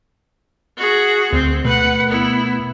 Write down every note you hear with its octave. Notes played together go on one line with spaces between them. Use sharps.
F#4 G#4
D2 C4
B2 A3 B4 F#5
B3 E4